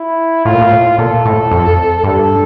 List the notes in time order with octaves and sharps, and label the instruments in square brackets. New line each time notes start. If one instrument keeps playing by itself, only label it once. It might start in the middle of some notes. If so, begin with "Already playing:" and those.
Already playing: [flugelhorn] E4
[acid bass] A2 [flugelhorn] F4
[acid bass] A#2
A2
[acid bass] A#2 [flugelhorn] A4
[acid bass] A2
F2
[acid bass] G2 [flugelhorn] A4